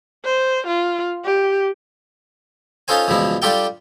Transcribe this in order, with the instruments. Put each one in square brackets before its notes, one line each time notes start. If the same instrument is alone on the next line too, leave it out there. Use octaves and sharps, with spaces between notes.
[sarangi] C5
F4
G4
[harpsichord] C#4 D#4 F4 A4 C5 G#5
C#2 G2 B2 E3 F3 E4
G3 D4 F4 G4 A4 G5